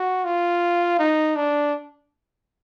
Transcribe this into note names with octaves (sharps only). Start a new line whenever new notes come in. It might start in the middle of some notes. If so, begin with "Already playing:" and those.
Already playing: F#4
F4
D#4
D4